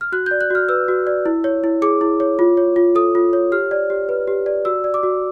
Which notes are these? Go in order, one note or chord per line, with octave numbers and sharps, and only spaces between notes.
F6
F#4 F#6
D5 G6
F#6
F#4 F6
B4 E6
F#4
D5
E4
C#5
E4
G#4 D6
E4
C#5
F4
C#5
F4
A4 D#6
F4
C#5
G4 F6
D5
G4
B4
G4
D5
F#4 E6
D5
D6
F#4